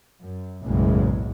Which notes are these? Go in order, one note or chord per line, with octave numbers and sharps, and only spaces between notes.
F#2
F#1 B1 E2 A2 C#3 G#3